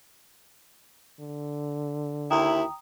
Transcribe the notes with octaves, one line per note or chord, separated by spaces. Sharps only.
D3
D#2 E4 G5 A#5 D#6